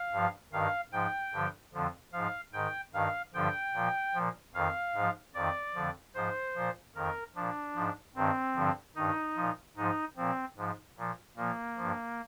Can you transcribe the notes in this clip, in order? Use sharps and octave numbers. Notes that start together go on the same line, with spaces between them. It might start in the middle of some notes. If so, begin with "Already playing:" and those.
Already playing: F5
G2 F3
G2 D#3 F5
G#2 F3 G5
G2 D3 F3
F2 D3 F3
G#2 F3 F5
G#2 D#3 G5
G2 D#3 F5
G2 D3 F3 G5
A#2 F3
A#2 F3
F2 D#3 F5
G#2 F3
F2 D#3 D5
F2 D3 F3
G#2 F3 C5
A#2 F3
F2 D#3 A#4
A#2 F3 D4
G#2 F3
G2 D#3 C4
G2 D3 F3
G2 D#3 D#4
A#2 F3
G#2 F3 D#4
A#2 F3 C4
G#2 F3
A#2 F3
A#2 F3 A#3
G2 F3